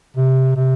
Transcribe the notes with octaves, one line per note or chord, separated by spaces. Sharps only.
C3
C3